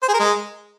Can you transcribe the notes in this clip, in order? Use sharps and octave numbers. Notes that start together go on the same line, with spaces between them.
C5
G#4
A#4
G#3